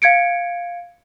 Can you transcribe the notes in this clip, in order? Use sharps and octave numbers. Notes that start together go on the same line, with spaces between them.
F5 G#6 C#7 D7